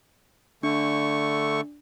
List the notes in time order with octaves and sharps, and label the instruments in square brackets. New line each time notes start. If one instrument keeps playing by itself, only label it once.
[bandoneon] D3 A3 C#6 [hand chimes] D4